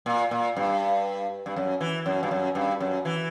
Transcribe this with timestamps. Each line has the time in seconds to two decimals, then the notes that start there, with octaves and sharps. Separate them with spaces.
0.06 A#2
0.31 A#2
0.57 G2
1.46 G2
1.56 F#2
1.81 E3
2.06 F#2
2.23 G2
2.31 F#2
2.55 G2
2.80 F#2
3.05 E3